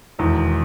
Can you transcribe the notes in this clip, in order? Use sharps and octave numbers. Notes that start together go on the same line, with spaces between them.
E1 E2 D#3